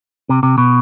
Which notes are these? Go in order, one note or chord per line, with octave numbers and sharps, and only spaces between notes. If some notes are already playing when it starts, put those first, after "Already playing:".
C3
C3
B2